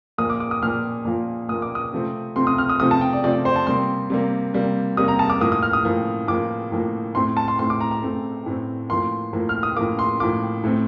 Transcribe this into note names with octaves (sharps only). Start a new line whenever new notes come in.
A#2 F3 A#3 D#6
D6
D6
D#6
A#2 F3 A#3 F6
A#2 F3 A#3
A#2 F3 A#3 D#6
D6
D#6
C3 F3 A3 C4
C3 F3 A3 C4 C6
D#6
F6
D#6
C3 F3 A3 C4 D#6
A5
G5
D5
C3 F3 A3 C4 D5
C5
A5
C3 G3 A#3 C6
C3 G3 A#3
C3 G3 A#3
C3 G3 A#3 D#6
A#5
A5
D6
A2 F3 A#3 D#6
D#6
F6
D#6
A2 F3 A#3
A2 F3 A#3 D6
A2 F3 A#3
A2 A3 C4 C6
A5
C6
A2 A3 C4 C6
D6
A#5
A#5
A2 A3 C4
A2 A3 C4
A2 F3 A#3 C6
A2 F3 A#3
F6
D#6
A2 F3 A#3 D6
C6
A2 F3 A#3 D6
A2 A3 C4